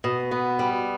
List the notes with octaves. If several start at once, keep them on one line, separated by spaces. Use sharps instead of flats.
B2
B3
G3